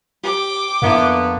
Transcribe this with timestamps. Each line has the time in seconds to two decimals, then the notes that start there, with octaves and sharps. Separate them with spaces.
0.23 G4 G5 D6
0.82 F2 D3 A#3 B3 E4 E5 F#5